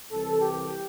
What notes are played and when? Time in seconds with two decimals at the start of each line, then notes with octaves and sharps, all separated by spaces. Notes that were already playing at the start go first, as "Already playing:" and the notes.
0.11 C2 C3 E3 A4
0.41 G4